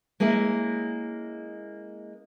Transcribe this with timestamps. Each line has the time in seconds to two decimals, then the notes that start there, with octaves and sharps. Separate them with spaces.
0.20 G#3 A#3 C#4 E4 E5